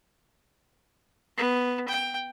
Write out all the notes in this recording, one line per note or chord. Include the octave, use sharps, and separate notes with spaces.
B3
G5